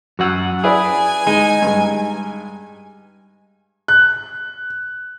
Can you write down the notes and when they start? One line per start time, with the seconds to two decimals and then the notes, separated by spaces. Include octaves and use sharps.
0.19 F#2 F#4 F#5 E6
0.64 E4 G#4 B4 D5 G#5
1.27 G#3 D#4
1.62 G2 G#3
3.88 F#6